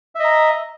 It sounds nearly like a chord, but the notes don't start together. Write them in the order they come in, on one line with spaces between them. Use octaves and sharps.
E5 D#5 A#5